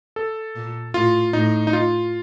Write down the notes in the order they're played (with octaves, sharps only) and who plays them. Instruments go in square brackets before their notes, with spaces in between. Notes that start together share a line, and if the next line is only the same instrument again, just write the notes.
[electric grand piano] A4
[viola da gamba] A#2
[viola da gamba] A2 [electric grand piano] F4
[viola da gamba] A2 [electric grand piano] D#4
[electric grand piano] D#4
F4